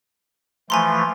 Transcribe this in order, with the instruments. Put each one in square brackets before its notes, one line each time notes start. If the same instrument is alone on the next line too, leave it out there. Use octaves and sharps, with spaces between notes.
[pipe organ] E3 F3 A3 [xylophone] G#5 A#5 C6